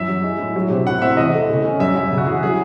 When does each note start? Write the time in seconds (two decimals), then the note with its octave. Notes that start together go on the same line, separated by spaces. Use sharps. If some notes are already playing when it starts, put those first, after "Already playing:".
Already playing: F#2 E3 E5
0.08 F#3
0.24 G#3
0.39 A2
0.56 F#3
0.70 C3
0.86 A2 F#5
1.02 C4 E5
1.17 E2 D#5
1.33 A3
1.49 C#3
1.65 C#4
1.80 F#2 E5
1.95 F#2 E5
2.12 C#3
2.18 F#4
2.26 E3 G#4
2.42 F#3 G#4